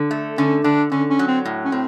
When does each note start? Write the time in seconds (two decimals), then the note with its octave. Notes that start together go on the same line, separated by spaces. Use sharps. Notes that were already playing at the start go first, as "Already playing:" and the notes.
Already playing: D3
0.11 A3
0.38 D3 C#4
0.64 D3 D4
0.92 D3 C#4
1.10 C#4
1.19 F#3
1.27 C4
1.45 A2
1.65 C#4
1.72 A2 C4